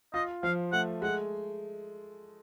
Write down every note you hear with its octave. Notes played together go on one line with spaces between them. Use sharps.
F4 D#5
F3 F5
A3 F#5
G#3 F#5